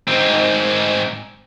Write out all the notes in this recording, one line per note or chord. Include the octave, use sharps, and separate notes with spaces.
G#2 C4